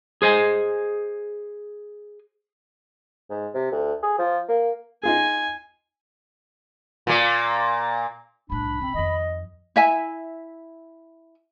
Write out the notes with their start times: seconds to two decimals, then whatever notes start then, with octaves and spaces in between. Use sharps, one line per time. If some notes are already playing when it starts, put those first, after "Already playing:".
0.22 G#4 C5 D#5 G#5
3.30 G#2
3.55 C3
3.72 D2
4.03 G#4
4.19 F3
4.48 A#3
5.03 D#4 F4 G#4 G#5
7.07 A#2 A#3
8.50 C2 A2 D4 B5
8.81 C3 C4
8.94 F2 D#3 D#5
9.76 E4 E5 G#5